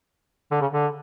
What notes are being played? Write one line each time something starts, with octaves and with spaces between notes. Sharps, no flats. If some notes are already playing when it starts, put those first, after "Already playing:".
D3
C#3
D3